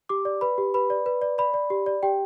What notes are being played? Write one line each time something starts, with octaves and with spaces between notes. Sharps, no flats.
G4 D6
D5
B4 B5
G4
B4 B5
D5
B4
D5
D5 B5
D5
G4
D5
G4 G5